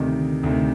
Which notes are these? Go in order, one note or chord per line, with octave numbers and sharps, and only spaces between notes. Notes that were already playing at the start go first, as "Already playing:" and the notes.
Already playing: D2 C3 D#3
D2 C3 D#3